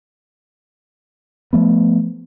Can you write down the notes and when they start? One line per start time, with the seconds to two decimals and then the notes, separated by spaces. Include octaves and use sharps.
1.53 F3 A3 B3